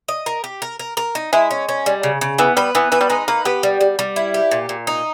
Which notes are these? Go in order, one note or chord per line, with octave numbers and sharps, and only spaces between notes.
D#5
A#4
G4
A#4
A#4
A#4
D#4
G#3 E4
C#4
C#4
G3
C#3
C#3
E3 B3
G3 B4
E3 B3
E3 B4
G3
G#3 D#4
A#3 B4
B3 G4
G3
G3
G3
E4
G4
A#2
A#2
D#4